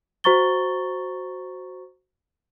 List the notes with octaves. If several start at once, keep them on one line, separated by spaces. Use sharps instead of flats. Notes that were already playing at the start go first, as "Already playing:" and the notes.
F#4 C5 A#5 C#6 A6 G7